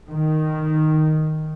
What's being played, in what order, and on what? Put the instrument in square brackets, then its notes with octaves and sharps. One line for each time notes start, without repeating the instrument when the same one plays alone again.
[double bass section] D#3